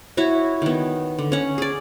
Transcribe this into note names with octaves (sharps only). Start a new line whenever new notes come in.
E4 F#4 C#5
D#3 B3
D3
C#4 F#5
G#4 D5